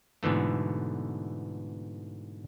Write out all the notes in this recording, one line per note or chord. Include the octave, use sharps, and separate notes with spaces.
G#2 B2 D3 E3 A3